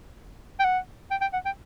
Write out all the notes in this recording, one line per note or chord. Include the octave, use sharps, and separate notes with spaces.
G5
F#5
G5
G5
F#5
G5